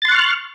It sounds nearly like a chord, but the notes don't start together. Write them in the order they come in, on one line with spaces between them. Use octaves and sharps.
A6 C6 F#6 C#6 F6